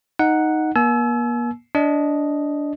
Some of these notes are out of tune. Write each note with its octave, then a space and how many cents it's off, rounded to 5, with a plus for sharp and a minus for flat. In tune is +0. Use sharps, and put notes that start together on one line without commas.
D#4 +0 F#5 +0
A#3 +40 G#5 +45 E6 +0
D4 -15 D#5 +0